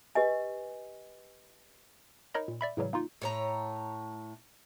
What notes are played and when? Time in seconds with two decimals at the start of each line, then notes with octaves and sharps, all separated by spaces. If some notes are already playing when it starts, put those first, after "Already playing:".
0.15 G4 B4 D#5 G#5
2.34 D#4 A#4 C#5 D#5 B5
2.48 A#2
2.61 D5 E5 B5
2.77 A2 C#3 E3 F#3 G3
2.93 A#3 D#4 F4
3.22 A2 C#5 A#5